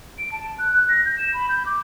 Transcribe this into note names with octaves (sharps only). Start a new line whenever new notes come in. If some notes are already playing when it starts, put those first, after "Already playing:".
D7
A5
F#6
F#6
A#6
G6
E7
B5
G6
D6